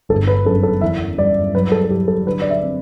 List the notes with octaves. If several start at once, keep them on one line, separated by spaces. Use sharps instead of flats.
G1 A4
B4
F#2 A4
A4
E2 E5
G3 D5
F#3 B4
A4
A4
F#3 G4
A4
D3 B4
D5
E5
C4